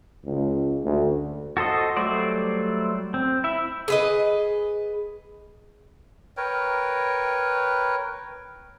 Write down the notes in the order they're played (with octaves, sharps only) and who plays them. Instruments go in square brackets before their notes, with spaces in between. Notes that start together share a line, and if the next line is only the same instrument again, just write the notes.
[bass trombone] C#2
D2
[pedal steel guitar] F#4 A4 C5 D#5
F#3 G3 A3 C5 D5
C4
E4 E5
[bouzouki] G#4 B4 D#5
[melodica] A#4 B4 C#5 G5